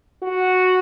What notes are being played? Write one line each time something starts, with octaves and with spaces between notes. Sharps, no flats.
F#4